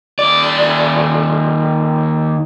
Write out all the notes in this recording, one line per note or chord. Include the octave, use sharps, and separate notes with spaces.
D#2 D5